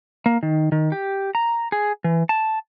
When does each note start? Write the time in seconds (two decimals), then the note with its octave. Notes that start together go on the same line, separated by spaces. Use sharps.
0.26 A#3
0.43 D#3
0.72 D#3
0.92 G4
1.35 A#5
1.72 G#4
2.04 E3
2.29 A5